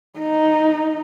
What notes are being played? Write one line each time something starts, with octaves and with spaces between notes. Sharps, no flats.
D#4